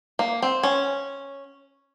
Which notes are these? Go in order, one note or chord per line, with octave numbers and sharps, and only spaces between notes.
A#3
C4
C#4